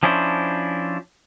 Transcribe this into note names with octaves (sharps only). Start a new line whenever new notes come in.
F3 C#4 D4 E4 C5